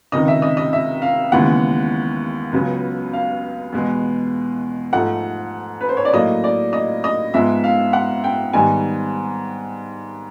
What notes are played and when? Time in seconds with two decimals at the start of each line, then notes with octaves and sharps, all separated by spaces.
0.12 C#2 C3 D#3 D#5
0.28 E5
0.42 D#5
0.57 D#5
0.73 E5
1.02 F5
1.32 D#2 C#3 E3 G#3 B3 F#5
2.52 C#2 C#3 F#3 B3
3.13 F5
3.72 E2 B2 G#3 B3
4.93 G#2 F3 A3 F#5
5.81 B4
5.89 C5
5.97 C#5
6.05 D5
6.13 A2 F#3 A#3 D#5
6.44 D5
6.73 D#5
7.04 D#5
7.34 G#2 F3 G#3 B3 E5
7.64 F5
7.93 F#5
8.24 G5
8.53 G#2 D#3 G3 B3 G#5